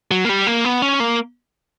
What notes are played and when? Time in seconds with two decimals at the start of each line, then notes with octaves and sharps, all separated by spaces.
0.11 F#3
0.25 A#3
0.29 G3
0.47 A#3
0.65 B3
0.82 C#4
1.00 A#3